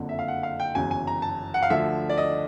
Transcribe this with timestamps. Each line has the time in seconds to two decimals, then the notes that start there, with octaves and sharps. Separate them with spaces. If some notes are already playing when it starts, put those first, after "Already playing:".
Already playing: F#1 F2 D3
0.09 E5
0.19 F5
0.28 F#5
0.43 F5
0.60 G5
0.75 G1 F#2 C#3 E3 G#5
0.91 G#5
1.07 A#5
1.22 A5
1.54 F#5
1.63 F5
1.70 D2 D3 F3 E5
2.10 D5
2.18 D#5